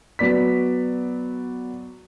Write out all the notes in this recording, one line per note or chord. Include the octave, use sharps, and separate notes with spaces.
F#3 B3 D5 B6